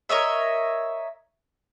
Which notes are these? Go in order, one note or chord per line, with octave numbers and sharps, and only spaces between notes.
A#4 C#5 D#5 E5